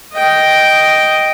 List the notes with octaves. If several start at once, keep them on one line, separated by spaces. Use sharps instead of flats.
D#5 G5